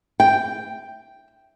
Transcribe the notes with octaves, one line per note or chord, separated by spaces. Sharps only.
G5